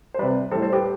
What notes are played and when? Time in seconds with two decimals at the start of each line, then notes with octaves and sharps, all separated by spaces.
0.14 C5
0.19 C3 G3 B4 D5
0.51 A2 G3 A4 C5
0.62 A4 C5
0.73 G4 B4